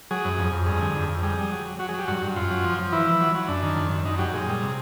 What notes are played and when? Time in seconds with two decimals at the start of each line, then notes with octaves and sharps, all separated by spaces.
0.11 F#3 G#4
0.25 F#2
0.38 F2
0.53 F2
0.66 G2 G#4
0.81 D3
0.95 F2
1.09 F2
1.23 G3 G#4
1.38 G3
1.52 F#3
1.66 F#3
1.79 F#3 F#4
1.89 G#4
1.94 F#3 G4
2.08 G2 F#4
2.22 G2
2.36 F#2 F4
2.50 F#3
2.64 F3
2.78 F3
2.92 E3 E4
3.07 E3
3.20 F#3
3.34 F#3
3.48 F#2 D4
3.63 D#3
3.77 F#2
3.91 F#2
4.05 F#2 D#4
4.19 F#3 G4
4.34 A#2 G#4
4.48 G3
4.62 C3